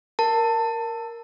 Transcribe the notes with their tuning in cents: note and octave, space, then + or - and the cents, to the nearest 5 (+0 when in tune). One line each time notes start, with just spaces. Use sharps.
A#4 +0 A5 +20